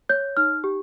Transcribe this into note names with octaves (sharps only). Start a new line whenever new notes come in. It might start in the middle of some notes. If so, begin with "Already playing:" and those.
C#5 G6
D#4 F6
G4